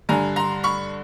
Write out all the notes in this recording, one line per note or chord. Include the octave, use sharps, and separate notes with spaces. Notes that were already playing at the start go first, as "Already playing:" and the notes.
G2 D3 G#5 A#5
A#5 C6
B5 C#6